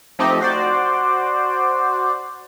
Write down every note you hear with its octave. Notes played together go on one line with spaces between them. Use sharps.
F3 A3 C4 D#4 G4 D#5
F#4 C5 D5